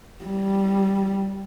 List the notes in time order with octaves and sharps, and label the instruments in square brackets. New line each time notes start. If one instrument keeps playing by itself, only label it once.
[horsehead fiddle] G3